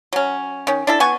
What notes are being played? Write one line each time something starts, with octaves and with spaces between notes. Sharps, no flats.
F#3 C#4
D#3 C#4
D4 E4 A4
B3 G#5 C#6